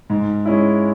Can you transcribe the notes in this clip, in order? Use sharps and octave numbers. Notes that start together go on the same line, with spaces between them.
G#2
G#3 C#4 E4